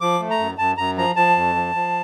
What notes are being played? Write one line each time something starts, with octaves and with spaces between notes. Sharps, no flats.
F3 D6
A3
A#5
F#2
F#2 A5
F#2 A#5
F3 A#5
F3 A5
F2
F3
F3